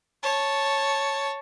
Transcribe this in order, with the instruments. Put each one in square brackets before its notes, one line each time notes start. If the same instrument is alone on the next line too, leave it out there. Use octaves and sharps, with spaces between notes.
[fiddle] C#5 A5